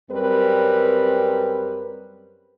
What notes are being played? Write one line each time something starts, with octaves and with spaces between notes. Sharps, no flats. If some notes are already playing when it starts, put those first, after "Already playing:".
F#2 G3 C4 A#4 B4